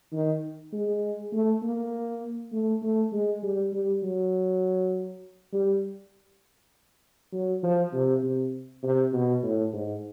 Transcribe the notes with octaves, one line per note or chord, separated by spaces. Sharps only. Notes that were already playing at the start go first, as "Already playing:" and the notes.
D#3
G#3
A3
A#3
A3
A3
G#3
G3
G3
F#3
G3
F#3
F3
C3
C3
C3
B2
A2
G#2